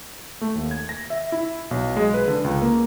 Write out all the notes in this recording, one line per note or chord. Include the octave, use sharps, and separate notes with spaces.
A3
D#2
G#6
A#6
E5
E4
B1
G#3
B4
D3
C#2
A#3